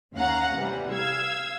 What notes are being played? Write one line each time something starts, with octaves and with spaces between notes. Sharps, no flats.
D#2 C#4 F5 F#5 A#5
C3 E3 G3
F5 E6 G#6